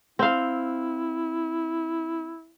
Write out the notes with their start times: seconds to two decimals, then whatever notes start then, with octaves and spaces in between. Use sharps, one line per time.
0.19 C4 E4 F5